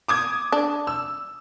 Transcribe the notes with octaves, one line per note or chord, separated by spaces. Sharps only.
D6 D#6 G#6
D4
E6